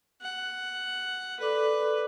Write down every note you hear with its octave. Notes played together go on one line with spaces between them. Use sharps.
F#5
A4 B4 D5 D6